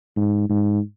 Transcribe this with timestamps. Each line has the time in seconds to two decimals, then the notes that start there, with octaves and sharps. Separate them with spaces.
0.16 G#2
0.50 G#2